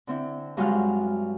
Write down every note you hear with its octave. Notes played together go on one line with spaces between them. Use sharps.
D3 C4 E4
G2 F#3 G#3 F4 F5 F#6